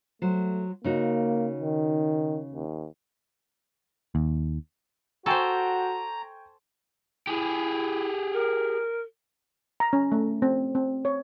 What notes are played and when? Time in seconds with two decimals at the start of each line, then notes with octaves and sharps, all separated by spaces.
0.22 F#3 A3 C5
0.84 C#3 A#3 D#4 F#4
1.60 D#3
2.53 D#2
4.15 D#2
5.26 F#4 A4 C5 G5 G#5 A#5 C#6
7.27 E4 G4 G#4
8.33 A#4
9.80 A#5
9.93 C#4
10.12 A3
10.42 C4
10.75 C4
11.05 C#5